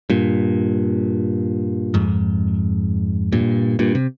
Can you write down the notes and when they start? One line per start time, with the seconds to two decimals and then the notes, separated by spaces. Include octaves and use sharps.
0.10 G2 A#2
1.94 F2 G#2
3.32 G2 A#2
3.79 G2 A#2
3.95 C3